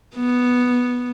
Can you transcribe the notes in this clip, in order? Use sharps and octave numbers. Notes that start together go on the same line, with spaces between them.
B3